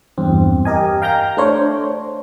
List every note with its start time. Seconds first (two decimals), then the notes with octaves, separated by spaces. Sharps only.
0.18 E2 G2 C4
0.65 G4 A#4 D#5 G#5
1.02 F5 G5 A#5 G6 A#6
1.37 A3 D4 C5 C#5